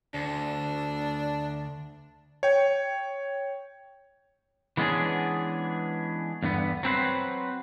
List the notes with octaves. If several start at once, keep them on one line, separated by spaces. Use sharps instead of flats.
D2 D4
C#5 G5
E3 G#3 B3 C#4 D4 G#4
E2 G2 D3 B3
F#3 C4 B4 C5